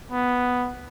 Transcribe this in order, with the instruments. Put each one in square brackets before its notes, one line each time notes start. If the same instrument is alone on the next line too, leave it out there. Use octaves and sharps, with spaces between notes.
[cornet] B3